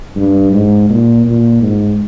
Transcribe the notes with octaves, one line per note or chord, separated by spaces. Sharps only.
G2
G#2
A#2
A#2
G#2